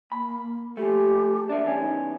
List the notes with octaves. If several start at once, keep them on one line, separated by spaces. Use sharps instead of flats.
A#3 B5
F3 A3 G4
A#3 D4 E5
E2 C#4
D#4